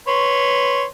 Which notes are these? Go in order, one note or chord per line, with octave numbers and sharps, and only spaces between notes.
B4 C#5 C6